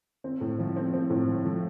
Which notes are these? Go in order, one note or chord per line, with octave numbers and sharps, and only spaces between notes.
C4
A2
F3
C4
C4
A2
F3
F3